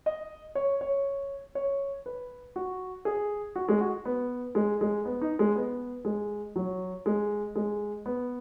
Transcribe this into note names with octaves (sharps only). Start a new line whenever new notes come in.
D#5
C#5
C#5
C#5
B4
F#4
G#4
F#4
G#3
F#4
B3
G#3
G#3
B3
D#4
G#3
B3
G#3
F#3
G#3
G#3
B3